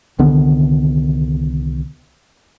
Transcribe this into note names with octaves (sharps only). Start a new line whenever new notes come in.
C2 D3 D#3 B3